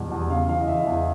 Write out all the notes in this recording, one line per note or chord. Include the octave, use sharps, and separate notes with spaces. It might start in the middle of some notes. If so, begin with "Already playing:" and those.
Already playing: E2 B2 G3
E2
C#3 F5
E3 F5
D#5
E2 E5
E2